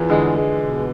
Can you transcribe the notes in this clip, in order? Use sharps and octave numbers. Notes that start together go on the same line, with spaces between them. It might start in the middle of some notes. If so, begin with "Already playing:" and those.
Already playing: E2 E3 F3
D3 G#3
G#3
B2